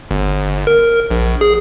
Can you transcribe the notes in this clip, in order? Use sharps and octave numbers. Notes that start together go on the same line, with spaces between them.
G1
A#4
A#1
G#4